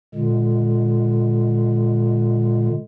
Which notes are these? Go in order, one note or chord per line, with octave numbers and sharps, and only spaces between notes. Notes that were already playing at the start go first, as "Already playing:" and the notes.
A#2 D3 G#3